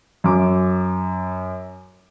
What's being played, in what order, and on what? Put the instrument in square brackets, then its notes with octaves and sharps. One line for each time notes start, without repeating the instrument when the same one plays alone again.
[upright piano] F#2 D6